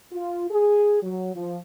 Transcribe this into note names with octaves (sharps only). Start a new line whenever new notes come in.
F4
G#4
F#3
F3